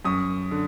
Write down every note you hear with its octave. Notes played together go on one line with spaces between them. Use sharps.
F#2 C#6 D#6
D3